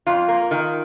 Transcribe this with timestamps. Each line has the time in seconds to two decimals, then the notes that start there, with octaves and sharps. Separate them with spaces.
0.07 F2 F4
0.28 A#3
0.51 D#3